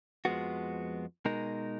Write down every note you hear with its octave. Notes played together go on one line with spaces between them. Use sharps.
F2 F3 G#3 B3 F#4
B2 G#3 D#4 A#4